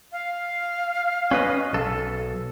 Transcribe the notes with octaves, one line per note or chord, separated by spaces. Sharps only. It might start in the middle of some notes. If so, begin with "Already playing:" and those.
F5
C#4 B4 D#5
B1 A4